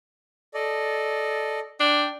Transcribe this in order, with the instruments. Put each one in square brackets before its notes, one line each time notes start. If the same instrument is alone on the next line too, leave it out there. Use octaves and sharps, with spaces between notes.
[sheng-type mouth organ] A4 D5 D#5
[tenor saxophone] D4 [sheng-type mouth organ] G5